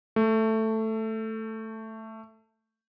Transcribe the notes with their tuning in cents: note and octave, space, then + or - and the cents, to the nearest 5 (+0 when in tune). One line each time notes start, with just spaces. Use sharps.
A3 +5